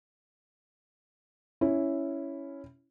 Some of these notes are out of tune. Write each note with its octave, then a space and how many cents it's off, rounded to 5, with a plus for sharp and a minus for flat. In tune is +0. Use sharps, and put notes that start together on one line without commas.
C#4 +0 E4 +0